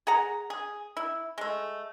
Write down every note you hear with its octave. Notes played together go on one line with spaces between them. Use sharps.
G#4 F#5 A#5
G#4
E4
G#3 A3